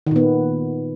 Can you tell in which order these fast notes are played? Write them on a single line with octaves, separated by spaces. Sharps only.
D#3 A#2 B3